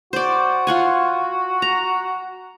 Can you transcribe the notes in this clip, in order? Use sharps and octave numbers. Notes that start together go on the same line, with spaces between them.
F#4 C5 D5
F4 F#5 G#5
A#5